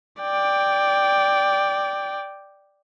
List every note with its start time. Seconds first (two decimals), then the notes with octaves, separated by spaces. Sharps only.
0.21 D5 G5